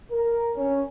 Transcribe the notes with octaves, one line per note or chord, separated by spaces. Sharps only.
A#4
C#4